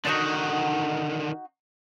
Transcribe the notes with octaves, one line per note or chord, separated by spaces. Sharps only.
D3 D#3 D4 D#4 F#4